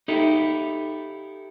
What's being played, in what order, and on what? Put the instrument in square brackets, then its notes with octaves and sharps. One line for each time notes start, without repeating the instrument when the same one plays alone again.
[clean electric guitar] D#4 E4 G4 A4